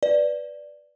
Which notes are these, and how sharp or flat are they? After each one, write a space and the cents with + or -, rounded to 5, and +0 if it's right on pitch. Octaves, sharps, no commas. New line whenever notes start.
B4 +0 D5 +0